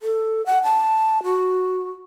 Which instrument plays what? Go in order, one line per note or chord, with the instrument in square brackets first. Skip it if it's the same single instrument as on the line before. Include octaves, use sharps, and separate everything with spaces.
[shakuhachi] A4
F#5
A5
F#4